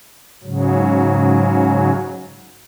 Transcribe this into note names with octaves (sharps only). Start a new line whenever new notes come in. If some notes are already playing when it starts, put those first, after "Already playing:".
G#2 C#3 F#3